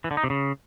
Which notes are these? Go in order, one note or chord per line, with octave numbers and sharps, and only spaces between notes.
E3
D3
D#4
C3
C#3